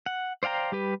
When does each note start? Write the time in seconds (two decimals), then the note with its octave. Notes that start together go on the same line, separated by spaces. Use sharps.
0.06 F#5
0.43 C5 D5 F5 G5 A#5
0.72 G3 G4 B4